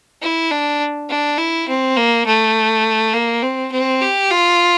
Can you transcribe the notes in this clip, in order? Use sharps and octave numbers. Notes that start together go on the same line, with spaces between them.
E4
D4
D4
E4
C4
A#3
A3
A#3
C4
C4
G4
F4